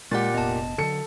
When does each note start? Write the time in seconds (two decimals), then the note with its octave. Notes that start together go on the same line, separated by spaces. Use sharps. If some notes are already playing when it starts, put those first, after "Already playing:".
0.11 A#2 G#3 G4 F#5 F#6 A6
0.34 F1 B3 D#5 A5
0.78 D3 F3 F#3 A4 C#7